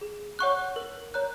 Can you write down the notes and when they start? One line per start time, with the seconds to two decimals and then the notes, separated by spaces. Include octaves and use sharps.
0.01 G#4
0.39 C#5 F#5 C#6 F#6
0.76 A#4
1.14 C#5 A#5 F#6